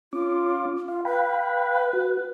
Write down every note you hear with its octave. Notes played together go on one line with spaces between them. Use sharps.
C#4 F4 D6
F4 F5
B4 F5 G5 B5
F#4